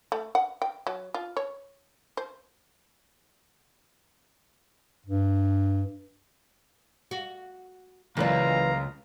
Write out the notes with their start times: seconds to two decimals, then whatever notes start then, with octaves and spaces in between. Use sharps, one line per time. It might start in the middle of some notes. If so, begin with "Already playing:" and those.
0.12 A3
0.35 F#5
0.62 G5
0.87 F#3
1.14 F4
1.37 C#5
2.17 C5
5.06 G2
7.11 F#4
8.17 C#2 E3 F#3 A#3 B4 D5 F5 A#5